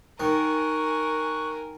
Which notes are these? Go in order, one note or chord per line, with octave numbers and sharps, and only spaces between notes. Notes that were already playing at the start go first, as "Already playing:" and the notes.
D#3 A#4 G#5 C#6 F#6